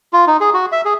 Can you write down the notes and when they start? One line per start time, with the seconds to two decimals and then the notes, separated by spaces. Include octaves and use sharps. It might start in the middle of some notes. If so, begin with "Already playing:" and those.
0.13 F4
0.27 D#4
0.41 G#4
0.54 F#4
0.72 E5
0.85 G#4